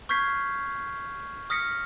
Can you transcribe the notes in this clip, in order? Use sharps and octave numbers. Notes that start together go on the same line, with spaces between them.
C#6 F6 G6 G#6 B6 C7
D#6 F6 A#6 B6 C#7